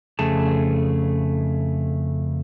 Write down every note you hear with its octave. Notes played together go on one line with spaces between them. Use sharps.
F2 C#3 A3 G#4 A5